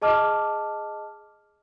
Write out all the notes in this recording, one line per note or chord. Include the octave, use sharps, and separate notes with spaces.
G#4 D#5 A5 D6 F6